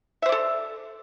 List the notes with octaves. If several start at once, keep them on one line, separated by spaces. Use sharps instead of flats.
A4 C5 D5 E5